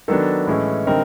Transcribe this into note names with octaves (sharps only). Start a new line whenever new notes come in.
D#3 F#3 B3 D4 A4
A2 E3 G#3 C#4
D3 G3 C4 D#4 A#4